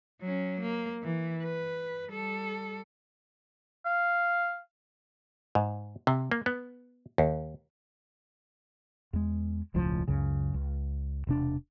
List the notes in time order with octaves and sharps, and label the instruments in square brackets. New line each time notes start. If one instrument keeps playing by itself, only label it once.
[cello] F#3 C#4
A#3
E3
B4
G3 A4
[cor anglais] F5
[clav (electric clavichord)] G#2
C3
A#3
B3
D#2
[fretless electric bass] E2 G#3
E1 C#2 A2 F3
C#2 F#2 C#3
C#2
E1 C3 D4